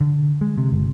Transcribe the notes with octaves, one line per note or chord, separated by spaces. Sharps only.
D3
G#3
C3
G1